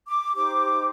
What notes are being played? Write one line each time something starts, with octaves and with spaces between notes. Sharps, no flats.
D6
D#4 G4 C5 D6